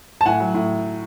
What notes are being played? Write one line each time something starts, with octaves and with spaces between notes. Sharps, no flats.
A5
A2 F#5 G#5
F#3
A2